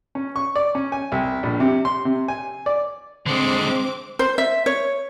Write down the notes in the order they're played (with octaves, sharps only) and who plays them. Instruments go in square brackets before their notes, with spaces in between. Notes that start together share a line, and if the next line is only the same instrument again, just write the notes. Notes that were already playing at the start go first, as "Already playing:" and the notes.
[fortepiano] C#4
C#6
D5
C#4
G#5
C2
A#1
C3
C6
C3
G#5
D5
[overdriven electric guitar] D3 G#3 [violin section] C4 D6
[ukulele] C5
E5
C#5